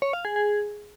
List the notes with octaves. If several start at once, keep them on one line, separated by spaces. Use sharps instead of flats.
C#5
F5
G#4
G#4